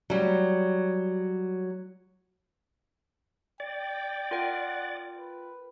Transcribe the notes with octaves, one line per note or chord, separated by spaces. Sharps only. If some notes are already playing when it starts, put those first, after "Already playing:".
F#3 G3
D5 G5
F4 A#4 F#5 G5
B4